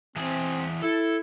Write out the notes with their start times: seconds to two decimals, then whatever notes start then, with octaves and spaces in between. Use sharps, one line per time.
0.16 E3 C4 G#4 A5
0.82 E4 A4